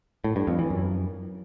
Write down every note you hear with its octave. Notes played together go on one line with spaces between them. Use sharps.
A2
G2
F2
E3
F#2